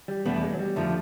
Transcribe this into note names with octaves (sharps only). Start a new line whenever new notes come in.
G3
E2 B2 G3 A3 B3 D4
G#3
F#3
G3
F2 D3 F3 A3